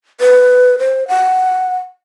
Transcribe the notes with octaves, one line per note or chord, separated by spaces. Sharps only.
B4
C5
F#5